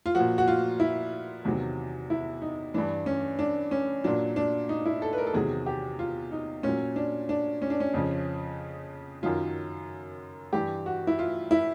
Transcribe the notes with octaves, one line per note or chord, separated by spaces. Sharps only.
F4
A#2 F3 F#4
F#4
F4
E4
E2 C3 D#3 F#3
E4
D#4
G2 E3 D4
C#4
D4
C#4
A#2 F#3 D4
D4
D#4
E4
A4
B4
A#4
A4
E2 C3 D#3 F#3 G#4
G4
F4
D#4
A#2 C#4
F#3
D4
D4
C#4
D4
C#4
F2 C#3 F3
F#2 D#3 F#3 F4
G2 E3 G4
F#4
E4
F4
E4